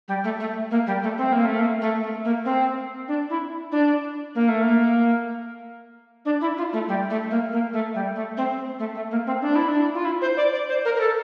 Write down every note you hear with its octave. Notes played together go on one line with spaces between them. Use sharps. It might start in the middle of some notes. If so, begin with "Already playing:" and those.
G3
A3
A3
A#3
G3
A3
C4
A#3
A3
A#3
A3
A3
A#3
C4
D4
E4
D4
A#3
A3
A#3
D4
E4
F4
A3
G3
A3
A#3
A#3
A3
G3
A3
C4
A3
A3
A#3
C4
D4
E4
D4
F4
E4
C5
D5
D5
C5
A#4
A#4
A4